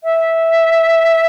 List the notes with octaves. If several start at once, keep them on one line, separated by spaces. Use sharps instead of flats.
E5